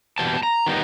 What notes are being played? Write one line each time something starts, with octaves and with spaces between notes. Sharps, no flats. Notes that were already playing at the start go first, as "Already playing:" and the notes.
E2 B2 G3 A5
A#5
D#3 G3 B3 D#4